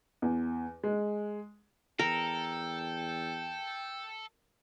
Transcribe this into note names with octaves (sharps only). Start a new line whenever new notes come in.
E2
G#3
E2 A4 A#4 G5